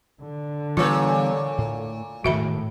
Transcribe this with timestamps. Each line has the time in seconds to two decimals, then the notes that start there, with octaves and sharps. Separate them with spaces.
0.21 D3
0.77 A#2 E3 G3 B3 F4 B4 C#5
1.58 A2
2.24 E1 A2 D#3 F#4 E5 B5